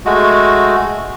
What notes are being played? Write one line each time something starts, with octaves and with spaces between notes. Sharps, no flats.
G#3 A3 F#4